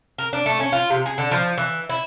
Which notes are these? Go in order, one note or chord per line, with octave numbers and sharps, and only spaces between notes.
A#4
D4
A3
C#4
F4
C3
G#4
D3
F3
E3
E4